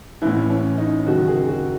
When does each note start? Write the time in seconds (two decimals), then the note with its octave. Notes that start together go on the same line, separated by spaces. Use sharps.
0.22 A1 A2 E3 E4
0.50 C#4
0.78 D#4
1.06 F#1 F#2 D#3 F#4
1.28 G#4
1.49 F#4